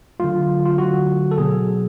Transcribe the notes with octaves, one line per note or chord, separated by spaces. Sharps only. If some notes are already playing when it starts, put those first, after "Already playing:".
D3 F#3 A3 F4
F4
D3 F#3 A3 F#4
A4
B2 F#3 B3 G#4